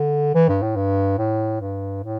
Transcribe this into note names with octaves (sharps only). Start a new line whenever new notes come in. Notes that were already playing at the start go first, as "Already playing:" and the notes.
Already playing: D3
E3
G2
A2
G2
A2
G2
A2